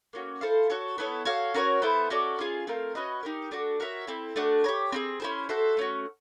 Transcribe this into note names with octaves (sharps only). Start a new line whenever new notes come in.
A#3 C#4 F#4
E4 A4 C5 F5
F#4 A4 C#5
B3 E4 A4 C#5
F#4 A4 C#5 F5
C#4 F#4 A#4 C#5
B3 E4 A4 C5
C#4 F#4 A4 D5
C#4 F4 G#4
A3 C4 F4 A#4
C#4 F#4 B4 D#5
D#4 G4 A#4
A3 D4 F#4
F#4 A#4 C#5 E5
C4 E4 A4
A3 D4 F#4
G4 A#4 C#5
C4 D#4 G#4
C#4 E4 G#4 C5
F#4 A4 C5 E5
A3 C#4 F#4